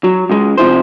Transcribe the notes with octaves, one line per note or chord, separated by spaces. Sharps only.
F#3
C#2 G#3
C3 F3 E4 C5